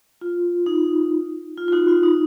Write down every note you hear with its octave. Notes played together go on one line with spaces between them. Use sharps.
F4
D#4
F4
F4
D#4 F#4
F4
D#4